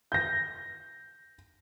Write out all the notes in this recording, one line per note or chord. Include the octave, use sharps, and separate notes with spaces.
G6 A#6